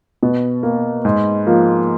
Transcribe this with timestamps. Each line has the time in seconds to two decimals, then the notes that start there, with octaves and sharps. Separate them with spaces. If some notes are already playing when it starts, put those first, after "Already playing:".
0.23 B2 B3
0.63 A#3
1.05 G#2
1.47 F3 A#3